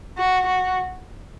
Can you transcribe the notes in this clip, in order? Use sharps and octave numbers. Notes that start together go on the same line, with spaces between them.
F#4
F#4